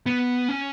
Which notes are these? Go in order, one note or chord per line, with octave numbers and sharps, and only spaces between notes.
B3
C#4